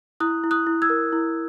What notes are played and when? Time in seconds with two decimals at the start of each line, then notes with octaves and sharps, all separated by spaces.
0.20 E4 D#6 F#6
0.44 E4
0.51 D#6 F#6
0.67 E4
0.82 E6 G#6
0.90 A#4
1.12 E4